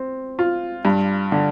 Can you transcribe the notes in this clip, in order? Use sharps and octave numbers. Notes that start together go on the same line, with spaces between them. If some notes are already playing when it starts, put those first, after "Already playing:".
Already playing: C4
F4
G2
D3